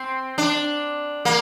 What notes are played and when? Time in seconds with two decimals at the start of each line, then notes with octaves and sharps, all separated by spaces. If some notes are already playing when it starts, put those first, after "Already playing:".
Already playing: C4
0.38 D4
1.25 A#3